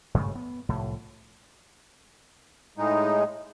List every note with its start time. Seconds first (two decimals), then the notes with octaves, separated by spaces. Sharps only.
0.14 G2 C#3 A3
0.35 B3
0.69 C2 A2 F3
2.78 A2 G#3 D#4